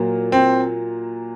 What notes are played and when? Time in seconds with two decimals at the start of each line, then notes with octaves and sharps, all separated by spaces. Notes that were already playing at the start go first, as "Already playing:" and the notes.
Already playing: A#2 F#3 A#3
0.32 C4